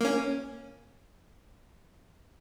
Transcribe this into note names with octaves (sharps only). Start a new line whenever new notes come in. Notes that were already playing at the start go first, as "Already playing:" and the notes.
A#3 C#4